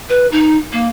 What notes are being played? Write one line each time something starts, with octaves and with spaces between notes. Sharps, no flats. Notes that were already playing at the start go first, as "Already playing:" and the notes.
B4
D#4
A#3